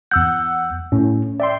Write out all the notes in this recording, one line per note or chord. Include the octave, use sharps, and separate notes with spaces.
E2 F#5 E6 G6
A2 C#4
D5 E5 G5 C6